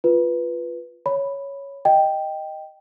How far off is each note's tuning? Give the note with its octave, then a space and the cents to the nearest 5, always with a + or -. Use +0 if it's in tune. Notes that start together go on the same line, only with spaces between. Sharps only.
F4 +0 B4 -5
C#5 +0 B5 +0
D#5 +0 G5 +0